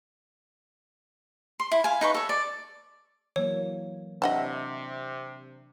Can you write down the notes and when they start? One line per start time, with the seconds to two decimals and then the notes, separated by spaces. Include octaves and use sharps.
1.60 C6
1.72 E4
1.84 F5 G#5
2.01 D#4 B4 C#6
2.14 A4 C#5
2.29 D5
3.36 E3 F#3 A#3 C#5
4.22 C3 D4 D#5 E5 F#5 A5